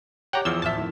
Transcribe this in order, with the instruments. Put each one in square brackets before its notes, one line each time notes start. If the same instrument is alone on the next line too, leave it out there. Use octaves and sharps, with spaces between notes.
[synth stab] G4 G5 [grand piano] C#5 D6 [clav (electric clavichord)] F#5 A#5
[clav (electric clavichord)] E2 F3 [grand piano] G#4 F6 G7 [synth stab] E6
[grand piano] D1 F6 B6 [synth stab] E5 A5
[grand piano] F2 A2 D#3